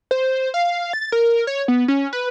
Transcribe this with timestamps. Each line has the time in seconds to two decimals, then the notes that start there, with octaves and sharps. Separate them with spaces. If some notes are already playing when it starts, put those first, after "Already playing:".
0.11 C5
0.54 F5
0.93 A6
1.12 A#4
1.47 C#5
1.68 B3
1.88 C#4
2.13 B4